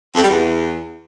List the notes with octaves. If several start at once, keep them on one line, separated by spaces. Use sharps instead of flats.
F2
G3
E2